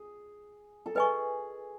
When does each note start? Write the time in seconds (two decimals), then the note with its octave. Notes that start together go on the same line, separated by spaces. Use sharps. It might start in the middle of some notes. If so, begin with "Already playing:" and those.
Already playing: G#4
0.86 A4
0.95 G#4 B4 D#5 G#5 C#6